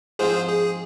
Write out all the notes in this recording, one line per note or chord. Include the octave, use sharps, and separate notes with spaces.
G#2 F3 C4 F4 G#4 C5
G#4